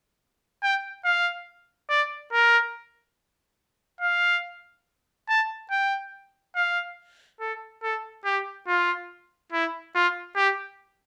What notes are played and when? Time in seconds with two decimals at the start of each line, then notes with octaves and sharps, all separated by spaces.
0.63 G5
1.05 F5
1.89 D5
2.32 A#4
4.01 F5
5.28 A5
5.71 G5
6.55 F5
7.40 A4
7.83 A4
8.25 G4
8.67 F4
9.52 E4
9.95 F4
10.36 G4